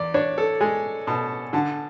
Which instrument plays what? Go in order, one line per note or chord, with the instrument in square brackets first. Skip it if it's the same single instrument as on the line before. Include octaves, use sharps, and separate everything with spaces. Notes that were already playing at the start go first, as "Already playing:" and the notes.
Already playing: [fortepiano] E2 [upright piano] D5
[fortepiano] D4 [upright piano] C#5
[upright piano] A4
[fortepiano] G#3 [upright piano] G#5
[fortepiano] B2 [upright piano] A5
[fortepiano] D3 [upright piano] A5